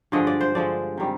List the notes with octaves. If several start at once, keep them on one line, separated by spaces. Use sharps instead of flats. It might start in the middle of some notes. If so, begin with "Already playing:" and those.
G2 D3 F3 G#3 D#5
D5
C5
G2 D3 F3 G#3 D5
C3 D#3 G3